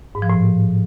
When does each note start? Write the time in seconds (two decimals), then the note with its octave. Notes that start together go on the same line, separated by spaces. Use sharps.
0.15 G#2
0.22 F3
0.30 A2